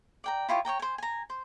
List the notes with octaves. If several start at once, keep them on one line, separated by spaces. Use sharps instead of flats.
D5 G5 A#5
E4 F4 G4 C#5
C#5 D5 G5 A#5
C5 G#5
G#5 A#5
C5